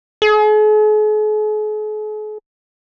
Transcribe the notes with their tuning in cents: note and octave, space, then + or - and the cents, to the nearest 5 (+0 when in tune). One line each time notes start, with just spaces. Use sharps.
G#4 +45